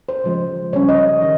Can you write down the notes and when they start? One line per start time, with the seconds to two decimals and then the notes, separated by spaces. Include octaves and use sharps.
0.09 C5
0.24 C#3 F3 G#3
0.73 C#3 G3 C#4 C#5
0.89 D#5
1.22 D#3